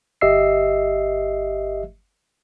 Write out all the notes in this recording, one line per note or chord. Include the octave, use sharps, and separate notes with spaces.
G1 G4 D#5 E5 E6 C7